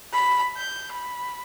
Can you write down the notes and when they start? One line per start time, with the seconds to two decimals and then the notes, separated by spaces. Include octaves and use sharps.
0.13 B5
0.57 G6
0.92 B5